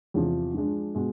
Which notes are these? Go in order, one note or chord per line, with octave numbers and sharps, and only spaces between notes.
E2 C3 F3
F3 G#3 D4
B2 G#3